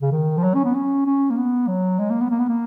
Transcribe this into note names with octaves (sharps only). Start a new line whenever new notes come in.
C#3
D#3
F3
F#3
C#4
B3
C#4
C#4
A#3
B3
F#3
G#3
A#3
B3
A#3
B3
A#3